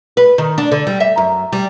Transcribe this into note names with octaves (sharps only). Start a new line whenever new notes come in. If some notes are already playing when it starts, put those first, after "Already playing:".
B4
D#3
D4
D3
G3
E5
F#2
G3